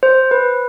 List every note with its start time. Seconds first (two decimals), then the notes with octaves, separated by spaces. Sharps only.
0.03 C5
0.31 B4